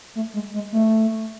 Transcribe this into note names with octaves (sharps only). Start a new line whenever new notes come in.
A3
G#3
G#3
A3